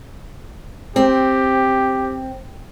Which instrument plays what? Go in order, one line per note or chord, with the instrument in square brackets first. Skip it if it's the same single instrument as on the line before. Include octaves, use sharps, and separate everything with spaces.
[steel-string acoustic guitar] C4 [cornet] G4